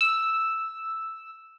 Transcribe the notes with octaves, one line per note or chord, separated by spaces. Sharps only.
E6